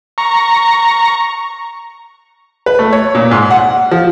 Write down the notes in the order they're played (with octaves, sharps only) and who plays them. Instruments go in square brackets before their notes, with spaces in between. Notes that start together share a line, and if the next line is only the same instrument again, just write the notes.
[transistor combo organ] A#5 C#6
[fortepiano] B4
A3
C#5
A#2
G#2
F#5
F3